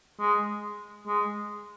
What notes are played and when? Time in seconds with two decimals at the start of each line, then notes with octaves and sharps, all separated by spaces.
0.20 G#3
1.07 G#3